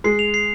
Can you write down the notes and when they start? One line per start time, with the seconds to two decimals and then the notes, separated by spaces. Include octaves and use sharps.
0.04 G#3 C7
0.19 F7
0.34 C7